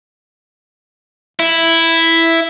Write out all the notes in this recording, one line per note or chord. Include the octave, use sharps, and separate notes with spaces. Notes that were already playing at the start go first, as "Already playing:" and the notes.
E4